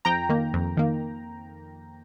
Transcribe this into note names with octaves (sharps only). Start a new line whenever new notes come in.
F2 G5 A#5
D#3 A#3
F2
D#3 A#3